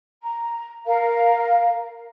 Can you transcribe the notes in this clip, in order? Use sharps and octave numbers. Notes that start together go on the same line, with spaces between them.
A#5
A#4 F5